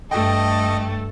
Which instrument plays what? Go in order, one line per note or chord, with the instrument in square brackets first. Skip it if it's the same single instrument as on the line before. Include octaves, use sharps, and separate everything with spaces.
[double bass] G2 [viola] A3 A4 [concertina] D#5 [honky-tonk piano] G5